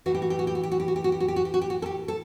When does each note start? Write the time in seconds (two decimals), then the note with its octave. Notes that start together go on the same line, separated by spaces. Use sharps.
0.06 A2 E3 F#4
0.15 G4
0.22 F#4
0.30 G4
0.39 F#4
0.47 G4
0.55 F#4
0.63 G4
0.72 F#4
0.80 G4
0.88 F#4
0.96 G4
1.04 F#4
1.12 G4
1.20 F#4
1.28 G4
1.36 F#4
1.45 G4
1.54 F#4
1.61 G4
1.70 F#4
1.82 A4
1.86 G4
2.08 A4